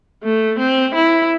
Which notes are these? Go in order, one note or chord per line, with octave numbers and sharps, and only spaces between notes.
A3
C4
E4